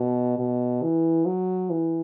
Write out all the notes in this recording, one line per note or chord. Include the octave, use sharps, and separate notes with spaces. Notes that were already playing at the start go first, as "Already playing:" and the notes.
Already playing: B2
B2
E3
F#3
E3